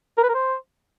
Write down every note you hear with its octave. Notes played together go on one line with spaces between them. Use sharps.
A#4
B4
A#4
C5